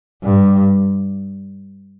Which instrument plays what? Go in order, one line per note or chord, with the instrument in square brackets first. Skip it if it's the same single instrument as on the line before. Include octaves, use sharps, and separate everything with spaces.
[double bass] G2